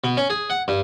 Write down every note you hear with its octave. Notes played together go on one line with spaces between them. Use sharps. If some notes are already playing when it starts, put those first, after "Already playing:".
B2
C#4
G#4
F#5
G2